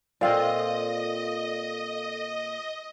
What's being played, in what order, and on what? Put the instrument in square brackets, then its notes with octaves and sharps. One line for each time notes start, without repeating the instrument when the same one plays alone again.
[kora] A#2 C4 F4 [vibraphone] A4 [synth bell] D5 F5 [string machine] D#5